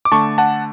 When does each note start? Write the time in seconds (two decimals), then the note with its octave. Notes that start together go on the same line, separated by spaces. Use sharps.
0.05 D6
0.12 D3 A3 A5 C#6
0.38 F#5 A5